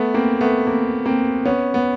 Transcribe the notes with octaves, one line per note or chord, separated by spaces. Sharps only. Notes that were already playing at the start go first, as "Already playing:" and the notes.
Already playing: A3 B3
A#3 C4
A3 B3
A#3 C4
A#3 C4
B3 C#4
B3